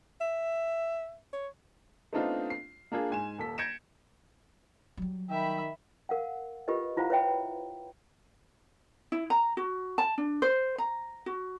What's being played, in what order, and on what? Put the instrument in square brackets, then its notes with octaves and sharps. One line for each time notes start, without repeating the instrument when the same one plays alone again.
[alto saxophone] E5
C#5
[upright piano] A3 B3 C4 D4 D#4 F4
C7
A#3 D4 F4 G#4
G#2 G#5 E7
D#1 A4 B6
G6 G#6 A#6 C#7 D7 E7
[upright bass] F#3 G3
[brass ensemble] D#3 [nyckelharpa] E5 B5 [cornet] G5
[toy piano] A#4 F5 F#5
F4 G4 A#4 B4 D#5
E4 F4 C5 F5 F#5 A#5
B4 C#5 E5 G5 B5
[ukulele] E4
A#5
F#4
A5
D4
C5
A#5
F#4